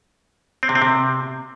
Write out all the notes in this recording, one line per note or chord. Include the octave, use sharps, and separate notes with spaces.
C4
C3
C4
C3